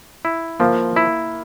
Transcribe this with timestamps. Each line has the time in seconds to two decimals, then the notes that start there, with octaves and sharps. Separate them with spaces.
0.25 E4
0.60 F3 A#3
0.96 E4